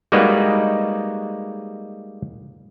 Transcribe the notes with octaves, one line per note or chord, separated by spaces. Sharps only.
G3 G#3 A#3 D#4 F#4 B4